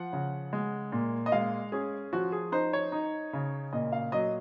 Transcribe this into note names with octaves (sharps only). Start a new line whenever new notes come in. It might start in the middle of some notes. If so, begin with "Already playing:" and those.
Already playing: F3 F#5
C#3
G#3
A#2
D#5
G#3 F5
C#4 G#4
F3 F#4
G#4
D#4 C5
C#5
D#4
C#3
A#2 D#5
F5
F#3 D#5